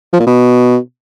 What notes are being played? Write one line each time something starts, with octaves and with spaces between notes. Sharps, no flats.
F3
A#2
B2